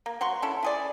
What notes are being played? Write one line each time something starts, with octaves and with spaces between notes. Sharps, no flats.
A#3
F#3 F#5 C6 C#6
C#4 E4 A4
E4 G#4 D5